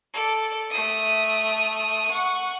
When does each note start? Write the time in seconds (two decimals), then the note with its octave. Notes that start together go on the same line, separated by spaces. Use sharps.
0.14 A4 D5
0.71 A3 D#6
2.11 F#5 C#6